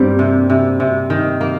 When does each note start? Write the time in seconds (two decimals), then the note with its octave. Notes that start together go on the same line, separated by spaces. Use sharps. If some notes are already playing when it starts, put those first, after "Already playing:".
Already playing: G2 G3 A#3 C4
0.19 C3
0.50 C3
0.80 C3
1.10 D#3
1.41 A#3